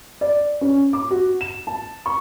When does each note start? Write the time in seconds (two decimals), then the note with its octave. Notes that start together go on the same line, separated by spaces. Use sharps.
0.21 D5
0.61 C#4
0.93 D6
1.10 F#4
1.41 E7
1.67 A5
2.06 C#6